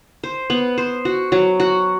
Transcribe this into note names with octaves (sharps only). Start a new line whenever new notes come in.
C5
B3
C5
F#4
F#3
F#4